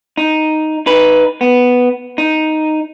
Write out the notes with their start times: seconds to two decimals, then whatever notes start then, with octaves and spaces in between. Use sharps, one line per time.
0.17 D#4
0.86 D#4 B4
1.41 B3
2.18 D#4